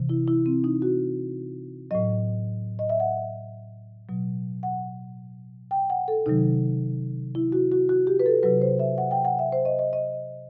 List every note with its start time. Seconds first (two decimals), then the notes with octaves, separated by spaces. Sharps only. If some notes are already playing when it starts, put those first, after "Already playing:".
Already playing: C3 E3
0.09 E4
0.28 E4
0.46 C4
0.64 D#4
0.82 F#4
1.91 A2 F#3 D#5
2.79 D#5
2.90 E5
3.00 F#5
4.09 B2 F#3
4.63 F#5
5.71 G5
5.90 F#5
6.08 A4
6.26 C3 D#3 F#3 D#4
7.35 E4
7.52 F#4
7.72 F#4
7.89 F#4
8.07 G4
8.20 B4
8.26 A4
8.43 C3 F#3 B4
8.61 C5
8.79 E5
8.98 F#5
9.11 G5
9.25 F#5
9.39 E5
9.52 C5
9.65 D#5
9.79 D#5
9.93 D#5